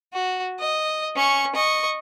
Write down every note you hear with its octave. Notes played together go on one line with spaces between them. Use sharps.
F#4
D#5
C#4 C#6
D#5 C#6